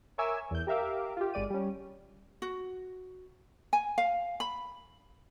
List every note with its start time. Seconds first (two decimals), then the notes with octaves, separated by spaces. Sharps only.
0.18 A#4 C#5 E5 G#5 D6 E6
0.51 E2 G6
0.67 G4 A#4 E5 F5 D6
1.17 F4 G4
1.34 G#1 G#3 D5 D#7
1.50 G3 C#4
2.42 F#4
3.73 G#5
3.98 F5
4.40 B5